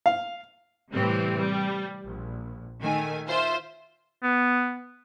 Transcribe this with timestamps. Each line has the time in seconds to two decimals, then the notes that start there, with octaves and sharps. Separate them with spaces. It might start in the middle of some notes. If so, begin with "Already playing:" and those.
0.06 F5
0.93 A2 C3 E3 G3 C4
1.38 G3
2.06 A#1
2.82 D#3 A3 G#5
3.26 F4 C5 E5
4.23 B3